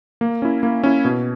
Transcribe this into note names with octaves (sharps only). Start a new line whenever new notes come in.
A#3
C#4 E4
A#3
C#4 E4
B2